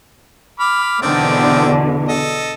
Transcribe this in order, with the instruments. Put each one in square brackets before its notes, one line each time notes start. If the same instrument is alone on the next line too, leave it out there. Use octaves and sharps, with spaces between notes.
[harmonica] B5 D6 F6
[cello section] E2 B2 D3 [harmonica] D#3 C4 D5
[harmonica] A4 D#5